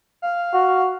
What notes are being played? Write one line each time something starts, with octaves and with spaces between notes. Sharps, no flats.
F5
F#4